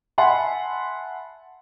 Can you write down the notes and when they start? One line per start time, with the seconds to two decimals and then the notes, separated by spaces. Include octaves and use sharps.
0.18 E5 F#5 G#5 A5 B5 C6